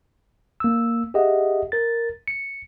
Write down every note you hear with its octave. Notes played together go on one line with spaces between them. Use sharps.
A#3 E6
G4 G#4 D#5 E5 F#5
A#4 A6
C#7